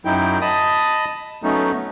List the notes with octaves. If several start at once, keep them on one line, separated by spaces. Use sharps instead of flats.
F#2 F#3 D#4 E4 G5
D#5 A5 B5 D#6
F#3 A3 B3 C#4 D#4